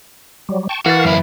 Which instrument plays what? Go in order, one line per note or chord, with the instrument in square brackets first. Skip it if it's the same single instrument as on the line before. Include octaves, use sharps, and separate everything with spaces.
[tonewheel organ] F#3 G3
G5 A5 C#6
[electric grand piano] E3 A6 [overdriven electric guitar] F#4 [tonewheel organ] A#4 F5
[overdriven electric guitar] F#2 E4